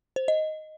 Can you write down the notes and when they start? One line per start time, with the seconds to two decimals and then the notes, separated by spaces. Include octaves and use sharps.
0.16 C5
0.28 D#5